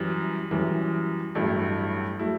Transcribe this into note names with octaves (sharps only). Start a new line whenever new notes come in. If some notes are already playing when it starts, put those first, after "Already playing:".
Already playing: F#2 E3 G3
F#2 E3 G3
A1 G2 F#3 A3 E4
F#3 A3 E4